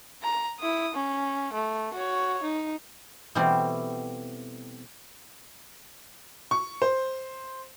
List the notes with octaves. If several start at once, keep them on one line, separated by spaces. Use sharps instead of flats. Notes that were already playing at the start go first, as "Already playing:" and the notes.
A#5
E4 D#6
C#4
A3
F#4 C#5
D#4
B2 E3 G3 A3 C4
C#6
C5